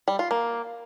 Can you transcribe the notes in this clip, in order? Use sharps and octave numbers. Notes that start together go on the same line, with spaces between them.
G3
F4
A#3